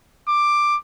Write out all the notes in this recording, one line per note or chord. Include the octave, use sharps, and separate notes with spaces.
D6